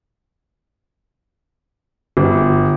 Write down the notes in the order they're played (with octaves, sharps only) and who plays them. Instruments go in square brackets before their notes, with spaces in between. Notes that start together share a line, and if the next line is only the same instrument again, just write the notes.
[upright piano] G1